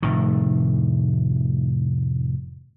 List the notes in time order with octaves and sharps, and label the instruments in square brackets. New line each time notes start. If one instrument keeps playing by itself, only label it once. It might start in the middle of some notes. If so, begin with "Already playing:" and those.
[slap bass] F1 A2 D#3